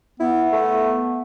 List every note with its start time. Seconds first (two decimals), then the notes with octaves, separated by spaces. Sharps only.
0.20 B3 E4
0.52 A3